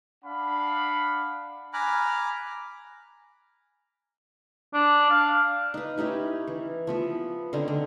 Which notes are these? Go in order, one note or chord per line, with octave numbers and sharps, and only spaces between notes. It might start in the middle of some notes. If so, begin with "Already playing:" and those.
D4 F5 F#5 B5
G#5 A#5 B5 D6 F6 F#6
D4
F5
D#4 B4
C#4 D#4 E4 G4
E3
F3 B3 E5
D3 C4 C#4 D#4
D3